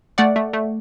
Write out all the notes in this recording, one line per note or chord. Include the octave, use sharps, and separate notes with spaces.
A3 D5 F#5
A3
A3